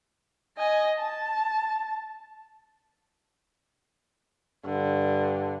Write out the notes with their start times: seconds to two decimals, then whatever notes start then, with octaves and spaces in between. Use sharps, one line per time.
0.58 D#5 G#5
0.99 A5
4.65 G2 D3